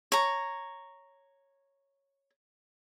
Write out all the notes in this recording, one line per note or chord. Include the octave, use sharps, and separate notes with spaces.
C#5 A#5